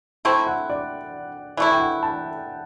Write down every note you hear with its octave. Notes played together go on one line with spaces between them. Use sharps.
A3 C4 E4 G5
F#5
D5
E3 A3 E4 D5
G5
F#5
A5